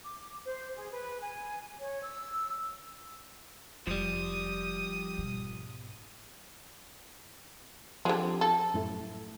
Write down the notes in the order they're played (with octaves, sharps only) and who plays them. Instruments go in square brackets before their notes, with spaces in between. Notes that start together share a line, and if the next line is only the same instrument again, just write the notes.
[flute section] D6
C5
G#4
B4
G#5
C#5
E6
[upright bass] F1 [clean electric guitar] F3 G3 [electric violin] D#6
[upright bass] G#2 B2
[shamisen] D3 G#3 [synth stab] F3 C4 G4
[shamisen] A4
[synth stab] F#2 A2 A3